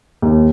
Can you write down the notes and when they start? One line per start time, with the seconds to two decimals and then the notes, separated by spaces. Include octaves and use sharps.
0.22 D#2